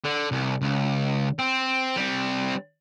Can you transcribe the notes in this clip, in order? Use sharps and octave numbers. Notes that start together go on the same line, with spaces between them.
D3
C2
C#2
C4
G3 C4